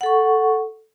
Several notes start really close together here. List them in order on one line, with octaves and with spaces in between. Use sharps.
F#5 A4 C#6